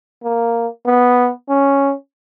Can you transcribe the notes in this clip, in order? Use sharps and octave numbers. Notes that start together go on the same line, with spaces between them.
A#3
B3
C#4